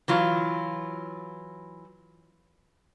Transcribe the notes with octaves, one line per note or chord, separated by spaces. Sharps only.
E3 F#3 F4